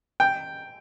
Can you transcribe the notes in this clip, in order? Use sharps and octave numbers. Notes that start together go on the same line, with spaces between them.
G5